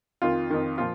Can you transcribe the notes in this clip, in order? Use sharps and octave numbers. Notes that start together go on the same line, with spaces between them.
F2 D#3 F4
F2 D#3
A#2 F3 F4